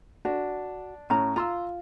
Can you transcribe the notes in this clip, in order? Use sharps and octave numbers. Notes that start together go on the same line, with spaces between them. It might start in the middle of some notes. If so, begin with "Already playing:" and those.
D4 F#4
A2 C#4 A#5
F4 A#5 C6 E6